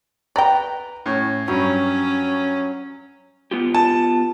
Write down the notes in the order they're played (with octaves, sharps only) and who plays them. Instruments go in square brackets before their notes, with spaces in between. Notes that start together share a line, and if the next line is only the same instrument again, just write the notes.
[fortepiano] B4 A#5 [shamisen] D5 G5
[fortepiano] A2 C#4
[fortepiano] G2 [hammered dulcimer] F#3 [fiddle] C#4
[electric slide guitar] B3 F4 G4
[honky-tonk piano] A5